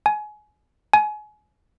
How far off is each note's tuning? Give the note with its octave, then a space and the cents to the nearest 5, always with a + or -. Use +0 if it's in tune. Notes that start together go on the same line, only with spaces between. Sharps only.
G#5 +25
G#5 +30